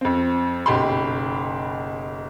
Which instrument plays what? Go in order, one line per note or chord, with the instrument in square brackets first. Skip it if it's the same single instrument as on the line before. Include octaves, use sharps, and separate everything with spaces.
[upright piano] F2 C4
F#1 B1 G4 G5 B5 C6